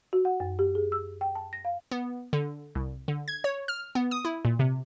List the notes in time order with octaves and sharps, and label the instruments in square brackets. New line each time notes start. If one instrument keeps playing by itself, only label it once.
[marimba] F#4
F#5
F#2
G4
G#4
E6
G5
A5
A#6
F5
[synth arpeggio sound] B3
D3
C2
D3
G#6
C#5
F6
B3
D#6
E4
A#2
C3